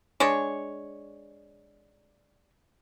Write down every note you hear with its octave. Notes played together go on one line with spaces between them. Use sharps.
G#3 D4 C#5